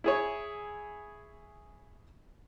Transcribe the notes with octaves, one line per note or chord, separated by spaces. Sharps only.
E4 G#4 C#5